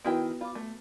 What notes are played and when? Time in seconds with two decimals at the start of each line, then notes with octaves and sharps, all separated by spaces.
0.05 D#3 B3 E4 F#4 B4 G5
0.41 F4 B5 D6
0.55 A3